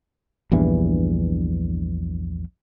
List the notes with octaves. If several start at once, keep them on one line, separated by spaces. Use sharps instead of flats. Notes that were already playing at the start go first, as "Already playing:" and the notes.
A#1 E2 G2 E3